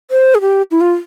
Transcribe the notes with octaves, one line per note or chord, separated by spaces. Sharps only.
C5
G#4
G4
E4
F4